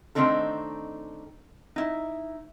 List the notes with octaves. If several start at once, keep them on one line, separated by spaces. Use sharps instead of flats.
D#3 A3 C4 D4 D#4 A4
D#4 E4